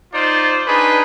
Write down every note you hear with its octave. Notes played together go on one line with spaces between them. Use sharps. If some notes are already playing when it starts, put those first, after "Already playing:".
D#4 F4 C5 D5
D4 D#4 G#4 B4